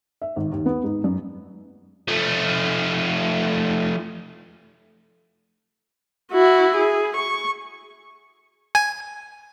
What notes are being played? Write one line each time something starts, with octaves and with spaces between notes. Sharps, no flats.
E5
G#1
D#2
B3
G#2
F#2
F3 A3
E4 F#4
G#4
C#6
G#5